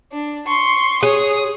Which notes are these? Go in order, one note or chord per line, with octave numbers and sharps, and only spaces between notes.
D4
C6 C#6
G#4 C#5 D#6